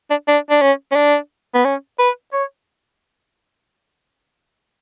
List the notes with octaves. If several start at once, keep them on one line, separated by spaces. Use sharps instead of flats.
D4
D4
D4
C#4
C#4
D4
B3
C#4
B4
C#5